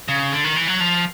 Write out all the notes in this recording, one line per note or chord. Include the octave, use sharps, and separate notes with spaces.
C#3
D3
D#3
E3
F#3
F3